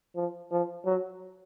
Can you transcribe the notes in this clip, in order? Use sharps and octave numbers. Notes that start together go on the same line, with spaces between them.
F3
F3
F#3